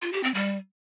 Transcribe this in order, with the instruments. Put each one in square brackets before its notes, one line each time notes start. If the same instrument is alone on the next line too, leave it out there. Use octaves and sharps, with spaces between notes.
[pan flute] F4
G4
C4
G3